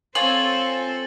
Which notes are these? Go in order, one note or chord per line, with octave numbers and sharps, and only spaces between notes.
C4 F4 A4 C5 C#5 G#5 A6 F#7